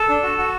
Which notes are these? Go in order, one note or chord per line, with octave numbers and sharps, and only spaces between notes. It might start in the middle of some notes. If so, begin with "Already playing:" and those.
Already playing: A4
D4
F#4
F#4